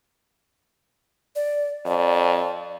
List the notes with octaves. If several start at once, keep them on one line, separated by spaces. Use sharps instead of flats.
D5
F2 D5